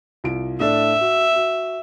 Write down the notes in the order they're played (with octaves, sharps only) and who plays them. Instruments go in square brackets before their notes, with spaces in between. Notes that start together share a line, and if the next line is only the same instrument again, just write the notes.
[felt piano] C2 F4 D7
[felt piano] A2 D4 A4 [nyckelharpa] E5
[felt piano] F#4
F#4